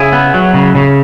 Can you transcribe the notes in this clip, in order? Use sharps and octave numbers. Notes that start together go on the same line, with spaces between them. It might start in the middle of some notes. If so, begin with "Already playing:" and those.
Already playing: C#3 E4 G#4
B3
F#3
C#3
C#3